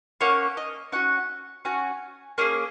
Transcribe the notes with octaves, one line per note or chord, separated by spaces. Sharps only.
A#3 C#4 F#4 C#5
D#5
C#4 F#4 F#5
C#4 F#4 G#5
A#3 C#4 G#4